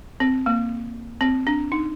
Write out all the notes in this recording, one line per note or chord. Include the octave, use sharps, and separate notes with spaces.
C4
A#3
C4
D4
D#4